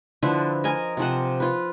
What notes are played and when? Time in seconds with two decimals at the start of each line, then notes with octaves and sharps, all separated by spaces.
0.23 D3 F3 E4 B4
0.64 A#4 D#5 G#5
0.97 C3 F3 F#5
1.40 F4 B4